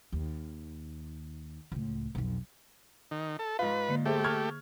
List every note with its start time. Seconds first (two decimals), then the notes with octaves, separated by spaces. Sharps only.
0.12 D#2
1.72 C#2 A2
2.15 B1 F2
3.11 D#3
3.39 A4
3.59 G#2 F4 B4
3.89 D3 A#3
4.05 A3 G4 G#4 C5 E5
4.24 C#6 F6 G#6